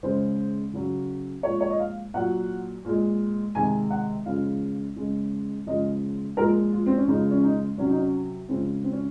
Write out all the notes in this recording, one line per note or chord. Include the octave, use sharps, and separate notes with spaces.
C#3 G#3 C5
C#3 F#3
A#2 F3 G#3 C#5
C#5
D#5
F5
A#2 F#3 F#5
A#2 G#3
C3 D#3 G#3 G#5
F#5
C#3 F3 G#3 F5
C#3 G#3
C#3 F3 G#3 D#5
A#2 F3 G#3 A#4
F4
C4
C#4
C#3 F3 G#3 D#4
C#4
D#4
C3 F#3 C#4
D#4
C#4
C#3 F3 G#3 C4
C4
C#4